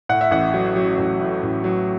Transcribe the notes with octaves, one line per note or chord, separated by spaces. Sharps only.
A2 F#5
E5
A1 F#5
F#3
F#3
A1
A2
A1
F#3